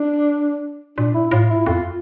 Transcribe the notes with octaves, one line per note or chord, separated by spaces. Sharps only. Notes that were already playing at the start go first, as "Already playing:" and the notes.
Already playing: D4
A#2 D4
E4
A2 F4
E4
F2 F4